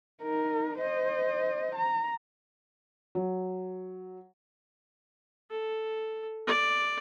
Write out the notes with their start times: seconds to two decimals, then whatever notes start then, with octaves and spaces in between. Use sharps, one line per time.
0.23 D#4 A#4
0.79 C5 D#5
1.75 A#5
3.15 F#3
5.51 A4
6.47 D5